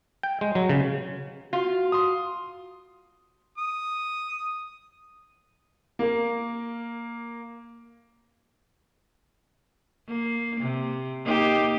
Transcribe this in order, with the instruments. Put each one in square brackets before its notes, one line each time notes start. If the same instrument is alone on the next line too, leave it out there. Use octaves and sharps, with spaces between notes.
[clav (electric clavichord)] G5
G#3
F#3
C#3
[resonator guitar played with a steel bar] F4 [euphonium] F#4
[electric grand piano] C6 D#6
[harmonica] D#6
[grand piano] A#3 A#4
[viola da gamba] A#3
C3
A#3 D#4 G4